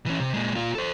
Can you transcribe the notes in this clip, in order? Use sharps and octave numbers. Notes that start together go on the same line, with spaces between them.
E3 C#4
C3
A#2 G#3
A#2 F4
A4 C5